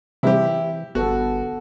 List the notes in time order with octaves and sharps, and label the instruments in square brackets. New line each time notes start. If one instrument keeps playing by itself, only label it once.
[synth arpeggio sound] C3 G3 C4 [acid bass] E3 [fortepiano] E4 G4
[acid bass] G1 [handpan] B3 A4 [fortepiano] F#4